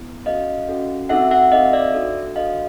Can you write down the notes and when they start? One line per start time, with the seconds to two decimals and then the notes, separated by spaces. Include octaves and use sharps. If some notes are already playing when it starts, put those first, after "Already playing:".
Already playing: B3 E4
0.26 C#4 F#4 A4 D#5 F5
0.68 C#4 F#4 A4
1.09 C4 D#4 F#4 A4 E5 F#5
1.31 E5 F#5
1.52 C4 D#4 F#4 A4 D#5 F5
1.73 D5 E5
1.94 D4 F#4 A4
2.36 D4 F#4 A4 D#5 F5